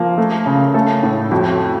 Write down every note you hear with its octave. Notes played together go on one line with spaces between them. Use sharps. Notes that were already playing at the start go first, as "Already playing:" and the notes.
Already playing: F3 A#3
A3
C#3
A3 A4
A2
F2 F#4